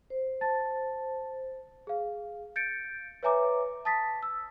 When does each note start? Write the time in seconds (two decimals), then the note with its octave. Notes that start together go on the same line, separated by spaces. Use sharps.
0.10 C5
0.41 A5 A6
1.87 G#4 F5
2.56 G6 A6 C#7 D7
3.23 B4 C#5 E5 G#5 A#5 D6
3.85 A5 D#6 A6 B6
4.23 E6